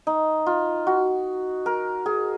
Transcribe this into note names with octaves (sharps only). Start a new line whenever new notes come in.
D#4
F4
F#4
A#4
G#4